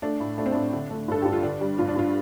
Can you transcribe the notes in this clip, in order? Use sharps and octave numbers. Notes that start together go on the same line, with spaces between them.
A3 D4
A2
A3 D4
C4
A2 D4
D3
A3
G2 A4
G2 G4
F4
D3 D4
G3
G2 F4
D4
G2 F4